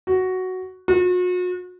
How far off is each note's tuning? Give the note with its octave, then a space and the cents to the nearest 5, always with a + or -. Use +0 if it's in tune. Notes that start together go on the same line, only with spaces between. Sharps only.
F#4 +5
F#4 -40